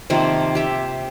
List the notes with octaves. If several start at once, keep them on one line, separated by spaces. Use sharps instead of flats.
C3 D#3 F3 A#3
G4 E5